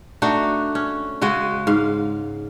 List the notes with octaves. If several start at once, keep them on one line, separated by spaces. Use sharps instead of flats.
A3 D4 D#4 F#4
C#4
C#3 G#3 F#4 D#5
G#2 F5